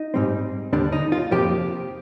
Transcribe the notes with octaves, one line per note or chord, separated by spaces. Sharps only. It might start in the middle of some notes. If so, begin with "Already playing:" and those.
Already playing: D#4
G#2 G3 C4
D#2 D3 G3 D4
D#4
F4
F2 C3 F3 A#3 G4